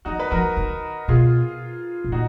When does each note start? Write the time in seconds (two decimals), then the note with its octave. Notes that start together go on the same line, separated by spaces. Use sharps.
0.05 F3 D#4 F#4
0.20 B4
0.31 F3 F#4 A#4
0.57 D#3
1.08 B2 F4 G#4
2.04 B2
2.12 A#2 D#4 F#4